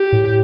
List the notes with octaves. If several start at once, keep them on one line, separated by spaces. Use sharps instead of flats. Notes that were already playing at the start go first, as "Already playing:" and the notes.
Already playing: G4
A2